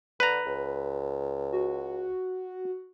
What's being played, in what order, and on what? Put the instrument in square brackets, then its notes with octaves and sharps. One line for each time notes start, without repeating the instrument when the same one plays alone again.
[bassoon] D3 [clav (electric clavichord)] B4 A#5
[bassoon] C#2
[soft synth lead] F#4